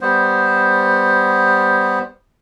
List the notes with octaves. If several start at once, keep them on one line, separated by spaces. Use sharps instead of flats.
G3 B3 C5